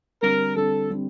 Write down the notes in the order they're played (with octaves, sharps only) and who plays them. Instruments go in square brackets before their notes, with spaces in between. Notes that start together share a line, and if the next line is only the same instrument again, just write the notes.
[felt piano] D3 G3 C4 [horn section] A#4
[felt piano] D3 G3 C4 [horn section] A4
[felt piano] D3 G3 C4